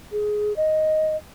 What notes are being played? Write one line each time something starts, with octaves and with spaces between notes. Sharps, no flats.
G#4
D#5